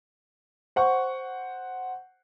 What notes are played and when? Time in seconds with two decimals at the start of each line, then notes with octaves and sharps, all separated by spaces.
0.76 C5 F#5 C#6